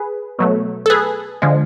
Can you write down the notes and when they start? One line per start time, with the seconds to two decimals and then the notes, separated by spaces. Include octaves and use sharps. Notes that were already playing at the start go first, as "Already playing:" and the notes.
Already playing: G#4 B4
0.39 B2 F#3 A3
0.86 A4
0.90 G#4 B4
1.42 D3 F3 G#3